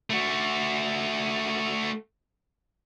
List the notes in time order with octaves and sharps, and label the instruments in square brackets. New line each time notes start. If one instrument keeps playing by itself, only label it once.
[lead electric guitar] A3 F#4